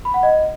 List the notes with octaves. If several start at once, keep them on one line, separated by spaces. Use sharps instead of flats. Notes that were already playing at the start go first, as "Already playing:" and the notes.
B5
F#5
D#5